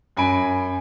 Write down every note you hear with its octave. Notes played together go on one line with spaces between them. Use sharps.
F#2 G#5 B5 D7